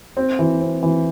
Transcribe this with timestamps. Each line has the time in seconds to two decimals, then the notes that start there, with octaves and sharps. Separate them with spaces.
0.17 C4
0.39 E3
0.61 C4
0.83 E3